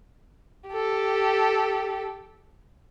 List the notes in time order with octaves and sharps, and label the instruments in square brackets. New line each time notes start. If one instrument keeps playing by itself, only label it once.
[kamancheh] G4 A4